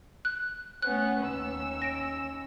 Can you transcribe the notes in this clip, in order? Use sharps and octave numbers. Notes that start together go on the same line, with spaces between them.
F#6
A3 B3 C#4 F#6
D#2 C#4 E6
A#6 D7